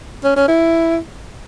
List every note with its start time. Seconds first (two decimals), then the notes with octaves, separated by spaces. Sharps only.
0.24 C#4
0.36 C#4
0.48 E4